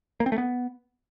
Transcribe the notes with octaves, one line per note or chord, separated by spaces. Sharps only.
A#3
C4
A3
B3